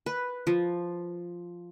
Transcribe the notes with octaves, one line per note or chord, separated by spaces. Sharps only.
B4
F3